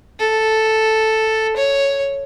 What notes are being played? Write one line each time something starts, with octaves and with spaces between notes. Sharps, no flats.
A4
C#5